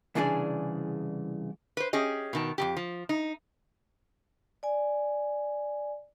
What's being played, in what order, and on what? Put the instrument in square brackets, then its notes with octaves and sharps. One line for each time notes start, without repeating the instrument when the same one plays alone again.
[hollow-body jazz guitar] C2 C#3 E3 D4 G#4 D5
[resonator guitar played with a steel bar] B4 C5
C#4 G4 G#4 D#5
B2 D#3 A5
F2 B2 G4
F3
D#4
[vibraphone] D5 G#5